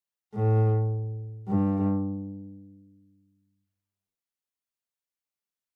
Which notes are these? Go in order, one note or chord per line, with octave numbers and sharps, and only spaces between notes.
A2
G2